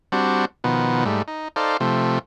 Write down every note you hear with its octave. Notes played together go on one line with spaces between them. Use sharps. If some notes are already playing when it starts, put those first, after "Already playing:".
G3 C4 D4 F#4
B2 D#3 F3 B3
G#2 G3 A3
D#4
D#4 A4 C5 D5 F5
C3 F3 A3